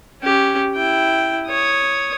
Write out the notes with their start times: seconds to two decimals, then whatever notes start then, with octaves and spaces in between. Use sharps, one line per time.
0.22 C#4 G4
0.75 E4 G5
1.48 C#5 D#6